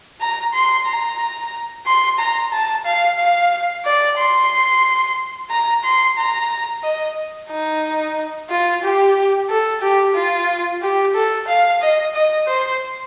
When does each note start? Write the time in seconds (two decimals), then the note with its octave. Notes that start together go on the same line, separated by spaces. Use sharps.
0.21 A#5
0.53 C6
0.87 A#5
1.86 C6
2.19 A#5
2.53 A5
2.86 F5
3.19 F5
3.85 D5
4.18 C6
5.50 A#5
5.84 C6
6.18 A#5
6.84 D#5
7.50 D#4
8.50 F4
8.83 G4
9.49 A4
9.82 G4
10.15 F4
10.82 G4
11.14 A4
11.48 F5
11.81 D#5
12.14 D#5
12.48 C5